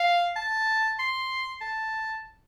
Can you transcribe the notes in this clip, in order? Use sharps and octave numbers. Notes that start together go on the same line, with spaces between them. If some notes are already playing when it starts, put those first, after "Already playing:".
Already playing: F5
A5
C6
A5